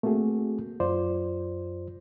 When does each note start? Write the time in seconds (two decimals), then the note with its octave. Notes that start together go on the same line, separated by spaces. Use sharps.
0.03 A3 A#3 C4 F#4 G#4
0.80 F#2 F4 C5 D5